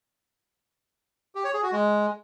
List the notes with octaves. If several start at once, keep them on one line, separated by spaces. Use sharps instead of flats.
G4
C#5
G#4
F#4
G#3